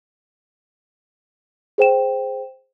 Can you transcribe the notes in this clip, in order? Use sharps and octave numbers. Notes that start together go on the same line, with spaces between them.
G#4 C5 G5 E7